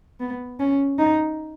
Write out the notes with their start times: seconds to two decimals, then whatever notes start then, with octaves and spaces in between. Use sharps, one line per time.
0.20 B3
0.60 C#4
0.99 D#4